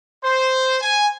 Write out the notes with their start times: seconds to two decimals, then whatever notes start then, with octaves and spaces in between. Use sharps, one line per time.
0.23 C5
0.82 G#5